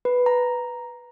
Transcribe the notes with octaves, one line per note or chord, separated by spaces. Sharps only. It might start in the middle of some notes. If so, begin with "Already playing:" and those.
B4
A#5